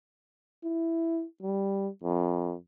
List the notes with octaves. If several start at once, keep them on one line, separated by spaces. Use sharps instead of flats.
E4
G3
F2